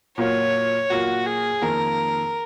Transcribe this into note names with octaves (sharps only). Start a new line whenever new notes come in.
A#2 F#3 A#3 F4 C#5
A#2 F#3 A#3 F4 F#4
G#4
F2 D#3 A#3 F4 A#4